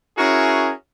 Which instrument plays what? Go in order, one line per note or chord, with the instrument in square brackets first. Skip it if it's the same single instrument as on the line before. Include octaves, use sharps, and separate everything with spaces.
[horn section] C#4 E4 F#4 G#4 A#4